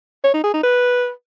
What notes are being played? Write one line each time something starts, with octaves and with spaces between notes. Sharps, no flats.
C#5
D#4
G#4
D#4
B4